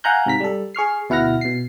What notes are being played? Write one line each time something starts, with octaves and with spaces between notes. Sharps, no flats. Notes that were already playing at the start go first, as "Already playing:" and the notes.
F5 F#5 G#5 A#5 F#6 G6
G#2 C3 A#5 B6
G3 A4
G#4 C#6 F6 C7
D2 B2 E4 F#5 F6 A#6
B2 C7